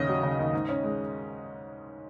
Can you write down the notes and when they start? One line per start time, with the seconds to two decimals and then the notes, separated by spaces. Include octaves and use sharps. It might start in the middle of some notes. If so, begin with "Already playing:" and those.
Already playing: D#2 C#3 C#4 D#5
0.09 F#3
0.23 C#3
0.39 D#2
0.53 G#2
0.69 C#4
0.84 G#3